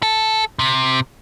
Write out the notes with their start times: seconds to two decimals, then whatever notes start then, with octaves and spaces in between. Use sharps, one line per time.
0.03 A4
0.59 C3